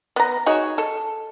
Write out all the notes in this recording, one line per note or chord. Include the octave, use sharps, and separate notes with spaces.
B3 A#5
D#4 F#4 G#4 C#5
A4